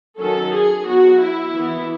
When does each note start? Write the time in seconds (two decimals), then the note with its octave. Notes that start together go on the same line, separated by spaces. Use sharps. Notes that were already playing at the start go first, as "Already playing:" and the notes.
0.19 D#3 F#3 C#4 A4
0.53 G#4
0.86 F#3 B3 F#4
1.20 E4
1.54 E3 B3